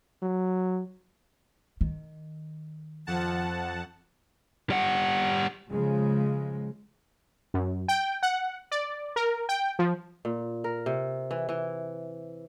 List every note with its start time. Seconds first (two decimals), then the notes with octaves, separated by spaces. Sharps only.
0.23 F#3
1.81 D#3
3.07 F2 F3 F#5 A5
4.70 G3 F#5
5.70 C#3 F3 G#3
7.54 F#2
7.88 G5
8.23 F#5
8.72 D5
9.16 A#4
9.49 G5
9.79 F3
10.25 A#2
10.64 A#4
10.86 C3
11.31 E3
11.49 E3